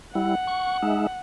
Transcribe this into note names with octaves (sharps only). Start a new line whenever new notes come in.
G3 E4 F#5
C#6
G#3 D#4 E5